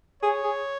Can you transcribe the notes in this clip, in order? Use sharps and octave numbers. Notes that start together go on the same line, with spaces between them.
G#4 C#5
G#4